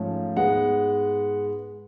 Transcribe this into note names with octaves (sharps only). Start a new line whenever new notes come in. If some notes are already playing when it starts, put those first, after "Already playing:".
Already playing: G#2 F3 A3 C#4
G#2 G#3 B3 F#5